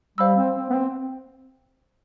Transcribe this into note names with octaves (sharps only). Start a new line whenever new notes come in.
G3 C5 F5 B5 E6
C4
C4
B3
C4